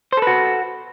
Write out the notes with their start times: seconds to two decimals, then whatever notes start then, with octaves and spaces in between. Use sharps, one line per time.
0.13 C5
0.17 A4
0.22 B4
0.27 F#4